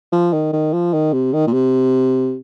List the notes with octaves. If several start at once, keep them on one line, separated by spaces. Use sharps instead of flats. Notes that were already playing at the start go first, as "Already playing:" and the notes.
F3
D#3
D#3
F3
D#3
C3
D#3
A#2
C3